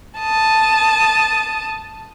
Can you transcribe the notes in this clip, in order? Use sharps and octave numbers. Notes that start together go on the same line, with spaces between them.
A5 D#6